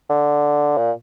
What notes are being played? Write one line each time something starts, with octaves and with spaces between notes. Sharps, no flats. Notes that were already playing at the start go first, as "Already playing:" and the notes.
D3
A#2